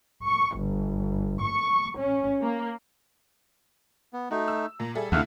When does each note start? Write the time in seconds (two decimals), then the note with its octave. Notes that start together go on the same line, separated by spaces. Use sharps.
0.23 C#6
0.57 G1
1.42 C#6
1.97 C#4
2.41 A#3
4.13 B3
4.31 A3 D#4 F#4
4.48 E6
4.80 A#2 A#5
4.95 G3 G#4 A4 E5
5.12 D2 C3 A3 E4 F5 F#5